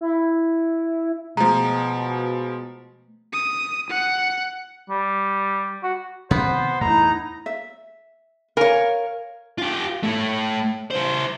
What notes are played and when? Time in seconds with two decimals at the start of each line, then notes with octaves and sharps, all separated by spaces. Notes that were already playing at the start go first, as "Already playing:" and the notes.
0.01 E4
1.37 B2 F3 G#3 A3 A#5
3.33 D#6
3.90 F#5
4.89 G3
5.83 F#4
6.31 C3 D#3 F3 B3 C5
6.81 E2 A2 D#4 E4 A#5
7.46 E5
8.57 A#4 C#5 F5 G#5
9.58 F4 G4
10.03 A2 A3
10.90 E4 C5